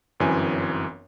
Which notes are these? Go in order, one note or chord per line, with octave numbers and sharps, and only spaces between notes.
G1 F#2 E3 C4 G#5